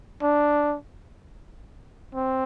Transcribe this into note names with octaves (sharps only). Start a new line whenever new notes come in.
D4
C4